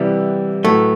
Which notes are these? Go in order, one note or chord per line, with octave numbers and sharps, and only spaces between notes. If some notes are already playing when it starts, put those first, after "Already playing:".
Already playing: C3 E3 G3 B3 E4 G4
A2 F#3 A3 B3